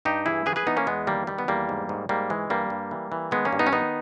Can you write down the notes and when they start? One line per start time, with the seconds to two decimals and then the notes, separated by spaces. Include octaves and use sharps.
0.05 G2 D#4 G4
0.26 E3 E4 G#4
0.46 E3 G#4 B4
0.56 G#4 B4
0.67 E3 B3 D#4
0.77 A#3 C#4
0.87 E2 G#3 B3
1.07 D#3 G3 A#3
1.27 D#3 G3
1.39 B3
1.48 E2 G3 A#3
1.69 G#2
1.89 G#2
2.09 G#2 G3 A#3
2.30 E3 G#3
2.50 G2 G3 A#3
2.70 G2
2.91 E3
3.12 E3
3.31 D#3 G#3 B3
3.45 A#3 C#4
3.52 G2
3.59 B3 D#4
3.67 C#4
3.72 D#3 B3 D#4